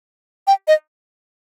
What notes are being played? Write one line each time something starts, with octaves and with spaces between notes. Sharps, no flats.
G5
D#5